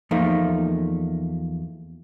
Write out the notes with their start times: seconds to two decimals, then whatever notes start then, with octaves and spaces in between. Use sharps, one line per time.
0.11 E2 F3 A3 A#3 D#4